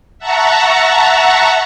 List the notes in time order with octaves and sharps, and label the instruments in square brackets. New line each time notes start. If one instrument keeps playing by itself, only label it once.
[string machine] E5 F#5 A5 A#5 C#6